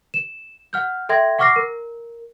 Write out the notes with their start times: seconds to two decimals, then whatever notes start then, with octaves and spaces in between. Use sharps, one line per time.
0.14 E7
0.73 F#5 F6 G6
1.09 A4 E5 G5 C6 G#6 A#6
1.39 F#5 C#6 D6 F6 A#6 C7
1.56 A#4